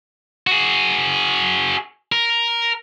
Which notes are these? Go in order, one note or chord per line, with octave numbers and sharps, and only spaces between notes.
F#4 G#4
A#4